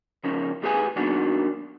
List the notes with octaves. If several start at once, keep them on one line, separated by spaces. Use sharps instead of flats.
C#3 F3 C#4 A#4
E2 A2 G4 G#4 B4 G#5
F#2 B2 D#3 F#3 A#3 D4